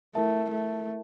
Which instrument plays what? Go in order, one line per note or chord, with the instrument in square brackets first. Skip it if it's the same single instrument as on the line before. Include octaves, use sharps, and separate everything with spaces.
[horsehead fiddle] A3 [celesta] E4 A#4 E5 A5
[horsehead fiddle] A3